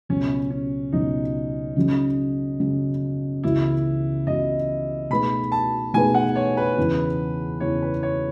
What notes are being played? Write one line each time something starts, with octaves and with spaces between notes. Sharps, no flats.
C#2 B2 F#3 C#4
C#4
C#2 B2 F#3 D#4
C#3 F#3 C#4
C#3 F#3 C#4
C#2 C#3 E3 B3 E4 F#4
C#2 C#3 E3 B3 F#4 D#5
B2 A3 D#4 G#4 B4 B5
A5
B2 A3 D#4 G#4 B4 G#5
F#5
C#5
B4
E2 C#3 E3 B3 E4
E2 C#3 E3 B3 E4 C#5
B4
C#5